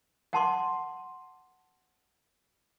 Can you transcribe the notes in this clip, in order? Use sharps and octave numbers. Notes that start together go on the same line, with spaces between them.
F#5 A5 C6 D6